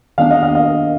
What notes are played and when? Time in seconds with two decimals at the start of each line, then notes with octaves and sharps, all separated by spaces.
0.18 D#3 B3 D4 F5
0.31 D#5
0.43 F5
0.55 D#5